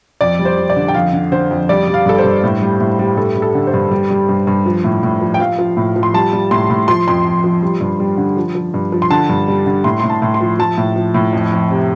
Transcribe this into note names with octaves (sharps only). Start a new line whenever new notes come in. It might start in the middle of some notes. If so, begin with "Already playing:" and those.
F2 D5
G3
C5
F2
D5
D3
G5
F2 F5
D3
D3 C5
F2
G3 D5
G3
F5
G2 A4
C5
G2
A2
G3
A2
G3
G2 A4
G3
A4
D3
C5
G2
G3
G3
G2
G2
F3
A2
A2
F3
G5
F3 F5
F3
A2
F3
C6
G3 A5
G3
A2 C6
A2
F3 C6
F2 C6
F2
F3
G3
G2
G3
D3
F3
F3
G2
F3
C6
D3 A5
G2
G3
D3
A2 C6
A2 C6
A5
A2
C6
F3
F3 A5
A2
F3
A2
F2
F2
C3